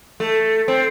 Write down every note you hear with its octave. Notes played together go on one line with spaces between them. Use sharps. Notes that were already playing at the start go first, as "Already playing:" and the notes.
A3
C4